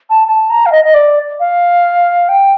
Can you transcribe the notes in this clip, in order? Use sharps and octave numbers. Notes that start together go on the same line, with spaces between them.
A5
A5
A#5
F5
D#5
D#5
D5
F5
G5